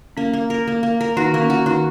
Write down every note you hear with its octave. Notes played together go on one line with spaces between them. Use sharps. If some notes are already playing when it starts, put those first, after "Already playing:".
A#3 C#4
A#3
A#4
A#3
A#3
A#4
D#3 D#4 F#4
A#3
C#4
F#4
D#3 D#4 F#4